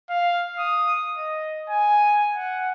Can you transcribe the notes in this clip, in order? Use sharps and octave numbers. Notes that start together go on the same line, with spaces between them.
F5
D#6
D#5
G#5
F#5